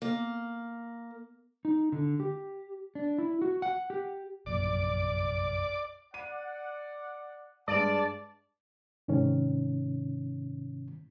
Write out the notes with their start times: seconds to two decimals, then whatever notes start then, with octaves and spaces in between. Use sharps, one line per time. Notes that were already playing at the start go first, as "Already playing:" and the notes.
0.02 A#3
1.65 D#4
1.92 D3
2.20 G4
2.95 D4
3.18 E4
3.42 F#4
3.62 F#5
3.90 G4
4.46 F1 A#1 F#2 D5 D6
6.14 D5 F#5 D#7
7.68 G2 G#3 D5 A5
9.08 G#2 C3 D#3 C#4